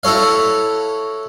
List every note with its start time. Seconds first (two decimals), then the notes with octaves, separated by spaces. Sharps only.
0.03 E4 F#4 A4 C#5 F5